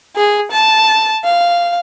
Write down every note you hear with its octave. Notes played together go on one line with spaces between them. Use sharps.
G#4
A5
F5